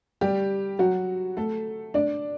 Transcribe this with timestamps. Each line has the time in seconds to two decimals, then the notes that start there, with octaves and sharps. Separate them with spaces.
0.21 G3 G4
0.79 F#3 F#4
1.37 A3 A4
1.94 D4 D5